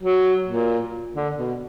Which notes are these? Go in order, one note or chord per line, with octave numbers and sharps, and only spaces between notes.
F#3
A#2
D3
B2